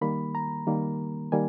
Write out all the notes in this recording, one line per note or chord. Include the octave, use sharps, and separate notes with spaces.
D#3 G3 A#3 B5
A#5
D#3 G3 A#3
D#3 G3 A#3 G#5